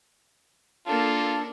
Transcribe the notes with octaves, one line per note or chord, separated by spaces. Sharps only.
A#3 D4 F4 A4 A5